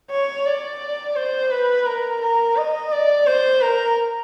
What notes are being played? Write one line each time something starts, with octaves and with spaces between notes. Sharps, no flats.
C#5
D5
C5
B4
A#4
A#4
D#5
D5
C5
A#4